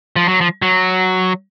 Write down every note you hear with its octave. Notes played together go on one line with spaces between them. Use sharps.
F3
F#3
F3
F#3